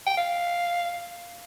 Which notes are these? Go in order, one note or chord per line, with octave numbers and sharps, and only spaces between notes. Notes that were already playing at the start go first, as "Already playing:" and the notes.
G5
F5